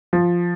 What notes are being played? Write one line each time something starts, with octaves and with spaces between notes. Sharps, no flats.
F3